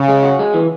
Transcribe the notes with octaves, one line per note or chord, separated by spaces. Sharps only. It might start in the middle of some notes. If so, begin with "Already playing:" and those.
Already playing: C#3
G#3
F#4
G#3
E3